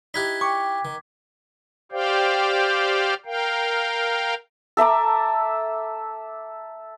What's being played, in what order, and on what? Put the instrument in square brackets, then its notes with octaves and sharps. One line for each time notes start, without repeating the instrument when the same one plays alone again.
[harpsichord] D#4 E4 G4 [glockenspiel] F#6 G#6 B6
[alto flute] G5 [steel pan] C#6 [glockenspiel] D6
[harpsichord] D#3
[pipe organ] G4 C5 D5 F5 G5
A#4 F5 G5
[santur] A4 E5 A#5 D6